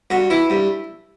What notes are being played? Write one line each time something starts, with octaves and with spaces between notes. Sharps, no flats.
G2 F#4
E3 E4
G2